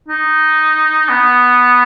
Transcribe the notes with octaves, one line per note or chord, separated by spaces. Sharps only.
D#4
B3